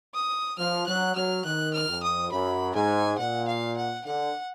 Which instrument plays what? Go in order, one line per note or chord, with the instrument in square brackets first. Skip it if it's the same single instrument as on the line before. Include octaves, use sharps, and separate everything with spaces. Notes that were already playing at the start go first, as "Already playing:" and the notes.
[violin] D#6
[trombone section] F3 [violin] F6
[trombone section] F#3 [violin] F#6
[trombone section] F#3 [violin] F6
[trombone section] D#3 [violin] F#6
[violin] F6
[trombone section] F2
[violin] D#6
[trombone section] F#2 [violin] B5
[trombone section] G#2 [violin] G#5
[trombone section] A#2 [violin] F#5
[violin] F5
F#5
[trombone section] D3 [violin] F#5